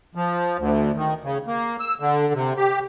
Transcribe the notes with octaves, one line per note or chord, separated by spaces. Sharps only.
F3
D2
D#3
C#3
A#3
E6
D3
C3
G4